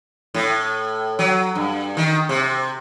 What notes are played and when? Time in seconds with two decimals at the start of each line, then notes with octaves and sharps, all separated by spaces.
0.34 A2
1.19 F#3
1.55 G2
1.97 D#3
2.29 C3